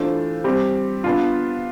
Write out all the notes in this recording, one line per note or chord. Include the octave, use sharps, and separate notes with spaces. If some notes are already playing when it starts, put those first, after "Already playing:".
Already playing: E3 A3 D4 F4 C5
G3 C4 G4
B3 D4 F4